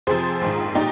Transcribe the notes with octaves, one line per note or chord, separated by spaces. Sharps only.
F2 C3 F3 G#4 C5
A#1 G#2 D#3
A#2 G3 D#4 G4